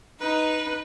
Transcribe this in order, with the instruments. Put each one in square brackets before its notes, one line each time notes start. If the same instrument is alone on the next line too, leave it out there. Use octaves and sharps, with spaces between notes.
[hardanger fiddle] D#4 [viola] B4